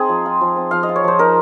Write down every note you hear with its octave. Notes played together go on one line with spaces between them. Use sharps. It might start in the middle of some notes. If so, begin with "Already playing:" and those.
Already playing: C4 D#4 G#4
F3
F4
F3
C4
F3 F5
D#5
F4
C#5
F3 C5
D#4 A#4